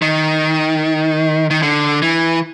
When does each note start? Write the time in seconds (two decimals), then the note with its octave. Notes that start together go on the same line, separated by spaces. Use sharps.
0.02 D#3
1.50 D#3
1.62 D3
2.02 E3